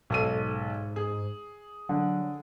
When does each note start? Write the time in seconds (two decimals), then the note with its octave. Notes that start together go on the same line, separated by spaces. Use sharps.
0.10 B1 G#2 A4 D#7
0.96 G#4
1.89 D3 F#3